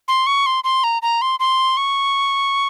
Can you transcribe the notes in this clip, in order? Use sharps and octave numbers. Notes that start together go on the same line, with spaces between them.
C6
C#6
C6
C6
A#5
A#5
C6
C6
C#6